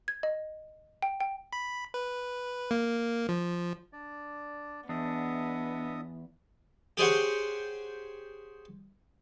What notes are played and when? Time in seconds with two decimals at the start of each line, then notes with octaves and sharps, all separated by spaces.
0.08 G#6
0.23 D#5
1.02 G5
1.20 G5
1.53 B5
1.94 B4
2.71 A#3
3.29 F3
3.93 D4 D5
4.89 E2 B3 D4 D#5 E5 D#6
6.97 G4 G#4 C5 C#5 F#5